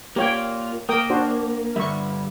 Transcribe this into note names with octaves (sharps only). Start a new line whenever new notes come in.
A#3 F4 G4 C#5 G5
A#3 A#4 G5 D#6
D4 F#4 C5
G2 D3 G3 E5 C#6